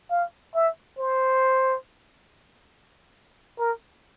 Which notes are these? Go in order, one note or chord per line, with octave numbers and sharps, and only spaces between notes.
F5
E5
C5
A#4